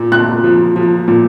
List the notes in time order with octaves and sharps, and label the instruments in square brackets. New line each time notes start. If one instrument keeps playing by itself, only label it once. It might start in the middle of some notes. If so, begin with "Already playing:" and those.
Already playing: [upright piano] A#2
A#2 F#6
F3
F3
A#2